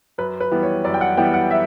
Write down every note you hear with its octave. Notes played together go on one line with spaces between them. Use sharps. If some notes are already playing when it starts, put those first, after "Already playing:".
F#2 B4
B4
E3 G3 B3
C#5
F#2 D5
G5
F#5
E3 G3 B3 G5
F#5
E5